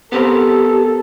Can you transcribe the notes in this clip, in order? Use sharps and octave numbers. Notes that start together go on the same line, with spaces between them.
B3 C4 G4 A4 A#4